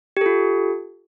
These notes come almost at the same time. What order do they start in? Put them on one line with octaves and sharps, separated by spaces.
G4 A4 F4